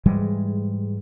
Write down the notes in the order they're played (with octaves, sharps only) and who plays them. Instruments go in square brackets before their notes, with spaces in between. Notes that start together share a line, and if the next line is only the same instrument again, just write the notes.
[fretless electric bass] G#2 E3 G3 G#3